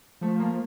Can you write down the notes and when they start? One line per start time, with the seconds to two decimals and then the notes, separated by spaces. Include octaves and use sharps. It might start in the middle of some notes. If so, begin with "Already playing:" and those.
0.21 F3 A3
0.40 A#3